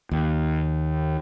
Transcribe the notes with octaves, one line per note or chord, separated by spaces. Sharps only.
D#2